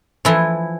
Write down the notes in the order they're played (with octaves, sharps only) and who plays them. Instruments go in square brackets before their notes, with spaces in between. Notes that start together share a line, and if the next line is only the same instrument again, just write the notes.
[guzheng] E3 F3 E4